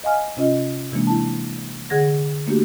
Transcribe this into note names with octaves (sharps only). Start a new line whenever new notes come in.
D#5 F5 G#5 F6
C3 C#4 F4 D#5
C3 E3 G#3 A#3 D4
E4 A5
D3 G#4 F#5 G#6 A#6
A3 A#3 D4 F#4 G4